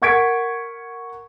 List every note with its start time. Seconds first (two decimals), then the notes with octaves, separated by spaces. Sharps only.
0.02 A#4 F#5 C#6 G#6 B6 D7